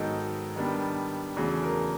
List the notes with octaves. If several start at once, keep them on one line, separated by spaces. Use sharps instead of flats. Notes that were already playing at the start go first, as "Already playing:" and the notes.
Already playing: G#2 D#3 F#3 B3 D#4 A4
D#3 G3 B3 D4
E2 C#3 F#3 A3 G#4
A#4